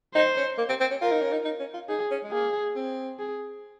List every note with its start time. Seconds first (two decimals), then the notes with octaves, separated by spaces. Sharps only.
0.15 D#4 C5
0.37 C#4
0.58 A#3
0.69 C4
0.80 C4
0.91 C#4
1.02 F4 A#4
1.12 D#4
1.22 C#4
1.32 D#4
1.45 D#4
1.60 C#4
1.74 F4
1.89 D#4 G#4
2.11 C#4
2.23 G#3
2.32 A#3 G#4
2.76 C4
3.19 G#4